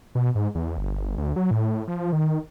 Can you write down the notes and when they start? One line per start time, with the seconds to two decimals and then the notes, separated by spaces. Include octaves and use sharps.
0.15 B2
0.35 G#2
0.55 E2
0.78 G1
1.18 D2
1.36 F#3
1.51 A2
1.88 F3
2.12 D#3